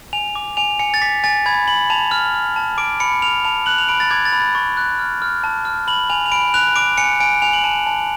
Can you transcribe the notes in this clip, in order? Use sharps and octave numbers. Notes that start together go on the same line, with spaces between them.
G#5 F7
D6
G#5 F7
G#5 C#7
A6
D6 B6
G#5 A6
B5 G#6
B5 F#7
A5 F7
F6
F6
A5
D6 D7
B5 C#7
F6 F7
A5 F7
F#6 F#7
F7
B5 D7
A6
D6 G#6
A6
B5
A6
C#6 A6
F#6
F6
F6
A5
F6
B5 F#7
G#5 F7
F7
B5 D7
F#6 F7
D6 D7
G#5 C#7
G#5 D7
G#5 F7
F#7
A5
A5